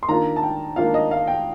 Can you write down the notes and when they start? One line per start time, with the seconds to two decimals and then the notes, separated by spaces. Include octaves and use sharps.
0.03 C6
0.09 D#3 A#3 D4 F4 A#5
0.36 A5
0.43 G5
0.76 D#3 A#3 D4 F4 F5
0.94 D#5
1.11 F5
1.27 G5